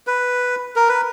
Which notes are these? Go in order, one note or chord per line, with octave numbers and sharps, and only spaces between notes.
B4
A#4
B4